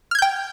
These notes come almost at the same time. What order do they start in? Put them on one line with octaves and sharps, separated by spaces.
F6 G#6 G6 G5